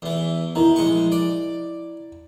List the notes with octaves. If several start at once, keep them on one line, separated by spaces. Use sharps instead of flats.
E2 E3
D#3 E4 A#5
A#1 G#3 C#6
D5